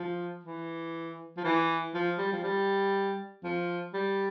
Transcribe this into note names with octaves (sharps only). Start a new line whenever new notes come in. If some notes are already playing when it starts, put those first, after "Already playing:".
Already playing: F3
E3
F3
E3
F3
G3
F3
G3
F3
G3